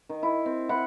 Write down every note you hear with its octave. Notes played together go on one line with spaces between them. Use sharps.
D#3
E4
C4
E4 F#5